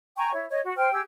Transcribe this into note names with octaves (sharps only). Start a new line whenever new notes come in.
G5 G#5 A#5 C#6
E4 C#5
C#5 D#5
F#4
C5 G5 F6
G4 G#4 E6